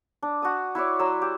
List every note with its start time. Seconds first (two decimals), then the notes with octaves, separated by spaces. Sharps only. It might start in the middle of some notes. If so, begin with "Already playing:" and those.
0.23 D4
0.42 F#4 A5 D#6
0.75 E4 F#4 C#5 D5
0.99 F#3 C6 E6
1.22 G4